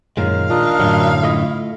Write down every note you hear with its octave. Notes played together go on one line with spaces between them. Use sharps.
F#2 A#2 D#3 G#3 F5
D4 F4 A#4 D#5
F#2 A2 D3 F#3
A3 E4 F4 D#5